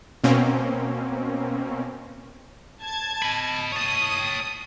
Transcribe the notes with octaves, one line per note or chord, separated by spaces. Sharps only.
B2 A#3 C4 C#4
A5 G#6
D#5 B5
C#5 A5 D#6